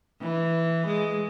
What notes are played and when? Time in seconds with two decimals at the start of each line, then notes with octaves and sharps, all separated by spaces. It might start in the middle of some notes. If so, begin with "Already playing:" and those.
0.21 E3
0.87 G#3